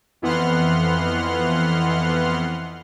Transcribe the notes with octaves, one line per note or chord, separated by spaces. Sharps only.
F2 E3 B3 F#5 C6 F6